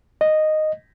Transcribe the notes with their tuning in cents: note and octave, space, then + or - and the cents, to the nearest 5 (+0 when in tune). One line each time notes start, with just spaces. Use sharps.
D#5 -5